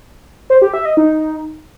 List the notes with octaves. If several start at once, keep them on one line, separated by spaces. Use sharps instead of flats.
C5
G4
E5
D#5
D#4